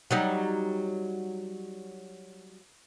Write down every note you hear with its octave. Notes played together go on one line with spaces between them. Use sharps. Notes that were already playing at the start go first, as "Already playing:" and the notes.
F#3 G3 D#4